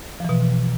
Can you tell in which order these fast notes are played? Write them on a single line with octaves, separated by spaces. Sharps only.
F3 E3 B2